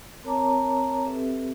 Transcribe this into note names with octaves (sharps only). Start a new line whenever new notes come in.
C4 A#4 C#5 A5 A#5 D6
C4 G4 A4 B4 E5